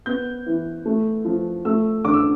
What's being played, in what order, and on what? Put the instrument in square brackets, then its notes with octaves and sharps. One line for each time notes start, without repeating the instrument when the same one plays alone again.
[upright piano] B3 G6
E3
A3
F3
A3 E6
D3 D6
E6